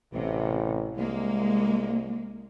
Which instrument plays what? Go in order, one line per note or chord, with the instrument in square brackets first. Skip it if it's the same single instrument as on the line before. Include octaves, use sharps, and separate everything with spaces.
[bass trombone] A1 [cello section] C3
[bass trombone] C2 [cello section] G#3 A#3